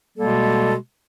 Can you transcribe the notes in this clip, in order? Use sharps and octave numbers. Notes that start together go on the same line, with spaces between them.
B2 G3 G#3 A#3 A4